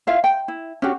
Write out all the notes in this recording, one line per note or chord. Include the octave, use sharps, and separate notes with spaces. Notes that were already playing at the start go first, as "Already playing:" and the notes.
E4 F4 E5 F5
G5
E4
C#4 D4 F#4 G4